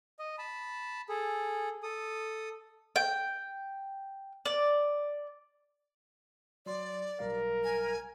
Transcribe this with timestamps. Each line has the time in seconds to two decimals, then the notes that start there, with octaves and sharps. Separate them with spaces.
0.19 D#5
0.38 A5 B5
1.09 G#4 A4
1.83 A4 D#6
2.96 G5
4.45 D5
6.66 F#3 D5 C6
7.19 B1 G3 A#4 F5
7.64 G#5